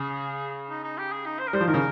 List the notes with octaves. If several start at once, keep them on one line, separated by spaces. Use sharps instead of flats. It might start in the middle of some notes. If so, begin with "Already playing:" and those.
Already playing: C#3 G#4
D#4
D#4
G4
G#4
D#4
C5
A#4
G3 C5
F3
D#3 A#4
C#3